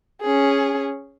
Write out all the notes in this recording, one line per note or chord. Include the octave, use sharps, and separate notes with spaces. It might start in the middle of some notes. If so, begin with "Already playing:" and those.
C#4 G#4